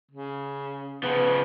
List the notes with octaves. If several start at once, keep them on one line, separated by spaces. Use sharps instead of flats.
C#3
C#3 F3 B3